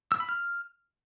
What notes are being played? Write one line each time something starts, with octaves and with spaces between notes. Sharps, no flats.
E6
B5
F6